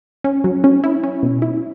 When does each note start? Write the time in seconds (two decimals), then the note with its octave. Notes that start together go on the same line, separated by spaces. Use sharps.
0.24 C#4
0.44 F#3
0.64 C#4
0.84 E4
1.03 C#4
1.23 B2
1.42 E4